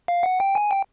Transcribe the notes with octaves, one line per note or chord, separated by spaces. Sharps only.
F5
F#5
G5
G#5
G5